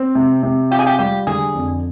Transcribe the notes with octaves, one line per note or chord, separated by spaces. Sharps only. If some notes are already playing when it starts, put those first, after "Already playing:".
Already playing: C4
C3
C3
F4 G4
G#4
G4
G3 G4
D3 G#4
F2